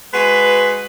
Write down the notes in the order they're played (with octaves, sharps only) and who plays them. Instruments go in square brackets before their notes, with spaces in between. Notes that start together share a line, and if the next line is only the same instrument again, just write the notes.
[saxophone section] G#3 F#4 B4